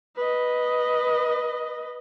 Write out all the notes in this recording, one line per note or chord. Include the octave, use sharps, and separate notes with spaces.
B4 D#5